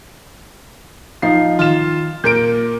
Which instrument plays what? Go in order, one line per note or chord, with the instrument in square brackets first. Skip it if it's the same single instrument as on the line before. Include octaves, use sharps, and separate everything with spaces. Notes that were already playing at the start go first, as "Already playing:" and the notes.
[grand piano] F3 [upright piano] D#4 F5 C7
[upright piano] D#3 E7 [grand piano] F4
[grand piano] A#2 A#3 D7 [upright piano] G6